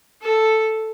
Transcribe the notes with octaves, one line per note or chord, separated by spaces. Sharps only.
A4